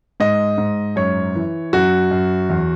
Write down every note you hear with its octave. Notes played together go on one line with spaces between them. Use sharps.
G#2 D#5
G#2
F#2 C#5
E3
F#2 F#4
F#2
E2